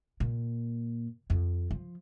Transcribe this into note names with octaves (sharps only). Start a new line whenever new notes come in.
A#2
F2
F3